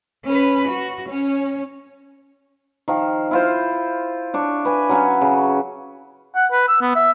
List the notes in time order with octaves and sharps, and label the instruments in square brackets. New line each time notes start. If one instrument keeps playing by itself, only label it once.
[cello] C#4 B4
F#4
C#4 C#5
[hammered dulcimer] D#3 F3 F5
E4 F4 C5
D4 C#5
B4 G#5
F#3 C#4 F#4
C#3
[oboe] F#5
B4
E6
B3
E5